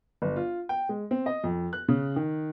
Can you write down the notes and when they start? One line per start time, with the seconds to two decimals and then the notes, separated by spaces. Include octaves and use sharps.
0.22 G1
0.36 F4
0.69 G5
0.89 G#3
1.11 C4
1.26 D#5
1.44 F2
1.73 F#6
1.88 C#3
2.16 D#3